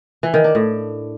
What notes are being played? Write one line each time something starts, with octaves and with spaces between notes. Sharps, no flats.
E3
D#3
D4
A2